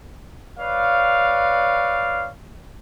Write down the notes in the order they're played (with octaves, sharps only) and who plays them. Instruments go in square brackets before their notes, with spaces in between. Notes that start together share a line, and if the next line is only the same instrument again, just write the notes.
[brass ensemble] B4 C#5 D5 F5